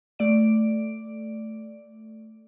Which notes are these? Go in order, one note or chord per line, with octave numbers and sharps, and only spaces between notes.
A3 D5 D7